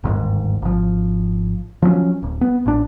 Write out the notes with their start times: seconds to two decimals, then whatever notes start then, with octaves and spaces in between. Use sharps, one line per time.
0.03 G1 D#2 G#2
0.62 G#1 F3
1.82 F3 F#3 A3 C#4
2.22 D1
2.41 B3
2.66 A1 D4